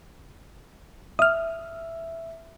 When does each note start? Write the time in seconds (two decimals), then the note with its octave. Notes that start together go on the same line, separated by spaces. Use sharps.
1.19 E5 D#6 F6